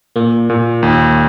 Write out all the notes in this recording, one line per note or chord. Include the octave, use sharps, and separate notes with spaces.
A#2 A#3
A#2
D#2